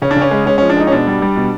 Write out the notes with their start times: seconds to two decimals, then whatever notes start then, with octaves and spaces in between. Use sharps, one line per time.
0.02 C#3 C#4
0.11 D4
0.16 C#3
0.21 C#4
0.31 G#3
0.46 G#3 C#4
0.58 F3 C#4
0.70 D4
0.77 G#3 D#4
0.87 C#4
0.92 B2 D4
1.07 G3
1.22 G3
1.36 B2